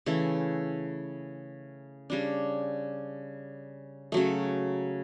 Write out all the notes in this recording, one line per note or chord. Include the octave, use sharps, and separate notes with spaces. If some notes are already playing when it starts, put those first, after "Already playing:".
C#3 E3 A3 E4
C#3 G3 D4
C#3 F#3 A3